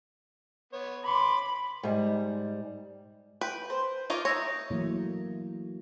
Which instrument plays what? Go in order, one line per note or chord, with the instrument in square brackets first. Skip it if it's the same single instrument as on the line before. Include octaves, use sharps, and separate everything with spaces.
[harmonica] B3 C#5
[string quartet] B5 [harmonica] C6 D6
[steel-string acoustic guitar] G#2 G3
[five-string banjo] B4 [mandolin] G5
[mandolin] C5
[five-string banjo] D#4 F4 A#4 [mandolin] C#5 D6
[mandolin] D#4 E5 A#5 [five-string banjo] C#5
[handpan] E3 F#3 A3 A#3 E4